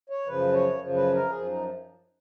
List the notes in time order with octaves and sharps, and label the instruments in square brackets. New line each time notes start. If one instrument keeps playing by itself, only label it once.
[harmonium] C#5
F#2 C#3 F3 B4
C#5
F#2 C#3 F3
B4
A#4
F#2 F3 G#4
D#4